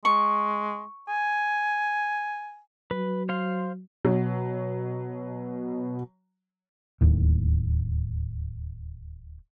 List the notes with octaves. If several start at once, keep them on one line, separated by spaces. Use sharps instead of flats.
G#3 C#6
G#5
F#3 B4
C5 F5 C6
B2 F#3
D1 D#2 A2